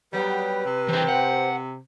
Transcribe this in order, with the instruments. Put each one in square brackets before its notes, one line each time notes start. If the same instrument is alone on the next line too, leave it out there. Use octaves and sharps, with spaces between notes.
[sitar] F#3 B3 G4 [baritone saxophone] G3 [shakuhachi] B4
[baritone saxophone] C3
[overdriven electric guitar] E3 A#4 [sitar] C4 G4
[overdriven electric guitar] F#5